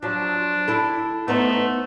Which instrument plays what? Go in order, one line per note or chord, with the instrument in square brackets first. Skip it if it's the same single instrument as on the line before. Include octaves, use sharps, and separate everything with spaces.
[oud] F3 F#3 [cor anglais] D4
[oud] E4 A4
[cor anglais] A3 [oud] B3 D#4 C5